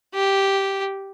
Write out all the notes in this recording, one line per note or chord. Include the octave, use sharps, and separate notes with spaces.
G4